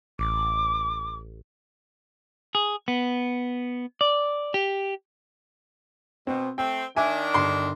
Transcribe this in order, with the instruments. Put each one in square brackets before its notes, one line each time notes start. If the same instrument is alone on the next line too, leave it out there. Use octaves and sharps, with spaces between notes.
[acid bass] A1 [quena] D6
[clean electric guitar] G#4
B3
D5
G4
[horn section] B2 [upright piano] C4
[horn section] A3 C4 [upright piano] G5
[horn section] D#3 D4 [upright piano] E5 [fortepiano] G#5
[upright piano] G1 [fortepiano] C6